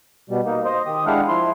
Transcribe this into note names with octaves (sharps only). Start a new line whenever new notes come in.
B2 G3
A#3 D#4
C5 D#5
D#3 G4 D#6
G#3 D4 E4 G4 F5 F#5
F3 E4 C6